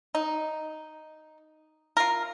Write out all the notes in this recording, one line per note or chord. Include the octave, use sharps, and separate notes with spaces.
D#4
F4 A#4